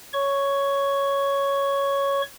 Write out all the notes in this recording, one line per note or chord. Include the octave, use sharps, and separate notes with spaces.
C#5 C#6